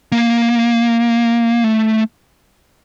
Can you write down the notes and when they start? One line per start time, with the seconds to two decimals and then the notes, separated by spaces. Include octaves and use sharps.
0.12 A#3
1.64 A3